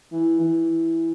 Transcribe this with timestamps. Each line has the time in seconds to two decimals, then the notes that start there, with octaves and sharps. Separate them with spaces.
0.12 E3
0.40 E3